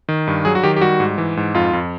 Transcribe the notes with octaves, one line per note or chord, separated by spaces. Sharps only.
D#3
G2
F#3 G#4
F#4
D#3 G4
G4
G3 F#4
G#2
E3
G#2
F2 F4
F2